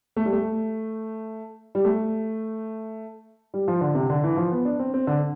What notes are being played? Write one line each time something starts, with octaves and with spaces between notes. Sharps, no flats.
A3
G3
A3
G3
A3
G3
F3
D3
C3
D3
E3
F3
B3
D4
C4
C4
D3